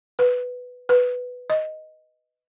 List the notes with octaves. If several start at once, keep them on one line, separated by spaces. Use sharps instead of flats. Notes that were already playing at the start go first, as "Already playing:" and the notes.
B4
B4
D#5